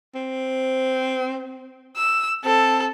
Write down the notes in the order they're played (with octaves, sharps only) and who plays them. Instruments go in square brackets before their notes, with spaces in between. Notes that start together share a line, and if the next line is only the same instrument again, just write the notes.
[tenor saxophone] C4
[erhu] E6
[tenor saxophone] C4 [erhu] A4